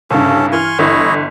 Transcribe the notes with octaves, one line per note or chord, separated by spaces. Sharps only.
C2 G2 C#3 C#4 A4
E3 G#5 C6 C#6 F6
G1 E3 E4 C#5 D#5